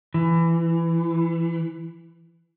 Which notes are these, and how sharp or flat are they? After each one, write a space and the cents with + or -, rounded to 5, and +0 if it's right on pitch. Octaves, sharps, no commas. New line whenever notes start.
E3 +20